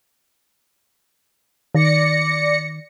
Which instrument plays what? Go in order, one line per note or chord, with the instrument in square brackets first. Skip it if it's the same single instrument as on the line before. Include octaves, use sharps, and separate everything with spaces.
[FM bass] D#3 [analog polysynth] D5 A#6 C#7